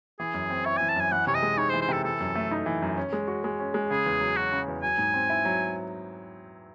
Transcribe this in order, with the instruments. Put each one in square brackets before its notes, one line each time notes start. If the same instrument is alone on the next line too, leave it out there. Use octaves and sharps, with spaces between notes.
[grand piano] E3 [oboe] G#4
[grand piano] F#2
C4
[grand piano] E4 [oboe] C#5
[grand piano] E3 [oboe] G#5
[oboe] A5
[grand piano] F#2 [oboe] G#5
[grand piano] E3 [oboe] F#5
[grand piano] C3 [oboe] C#5
[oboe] D#5
[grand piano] G#3
[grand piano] D#4 [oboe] C#5
[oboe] C5
[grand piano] E3
[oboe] C5
[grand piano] C3 [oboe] A4
[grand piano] E3 [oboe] A4
[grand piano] F#2
A3
D#4
E3
F#2
C#4
G#3
F#4
G#3
C#4
G#3
[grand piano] C#3 [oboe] G#4
[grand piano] E2
F#3
[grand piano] C#4 [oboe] F#4
[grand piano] C#3
E2
[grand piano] F#3 [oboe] G#5
[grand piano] G#2
C4
E4
F#3